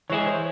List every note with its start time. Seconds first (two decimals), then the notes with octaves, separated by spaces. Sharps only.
0.10 E3 G#3 E4 G#4 C#5
0.27 C5